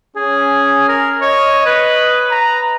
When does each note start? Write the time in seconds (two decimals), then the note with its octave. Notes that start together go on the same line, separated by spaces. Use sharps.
0.16 C#4 G#4
0.88 A#4
1.22 C#5 D#5
1.66 B4
2.31 A#5